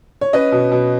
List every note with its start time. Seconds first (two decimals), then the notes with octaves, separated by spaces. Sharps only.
0.21 C#5
0.33 C#4 B4 D#5
0.52 B2
0.72 B2